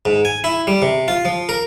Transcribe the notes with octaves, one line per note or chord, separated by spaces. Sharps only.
G#2
G#5
E4
G3
C3
F4
F3
A#4